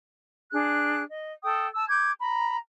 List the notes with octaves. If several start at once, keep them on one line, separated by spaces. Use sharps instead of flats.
D4 G#4 F#6
D#5
A4 G5 D#6
A5 E6
D6 G6 G#6
A#5 B5